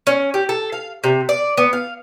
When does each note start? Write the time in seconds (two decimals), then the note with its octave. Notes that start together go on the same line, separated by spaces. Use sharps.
0.07 C#4
0.34 G4
0.49 A4
0.72 F5
1.04 C3
1.29 D5
1.57 B3
1.73 F5